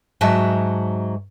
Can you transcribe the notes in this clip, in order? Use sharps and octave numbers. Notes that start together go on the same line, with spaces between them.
G#2 F#3 F#4 D#5 E5 A5